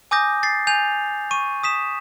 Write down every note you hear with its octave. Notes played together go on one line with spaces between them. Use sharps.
G#5 D6 D#6 G6 A#6
A6 C7
G#5 G6 F7
C#6 D#7
D#6 B6 E7